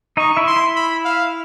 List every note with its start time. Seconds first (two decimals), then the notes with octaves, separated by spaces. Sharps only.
0.17 D#4 D#5 C#6
0.37 E4 E5
0.47 C6
0.56 E4 E5
0.76 B5
1.05 F5